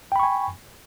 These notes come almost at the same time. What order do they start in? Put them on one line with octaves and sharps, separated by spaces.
G5 B5 C#6 G#5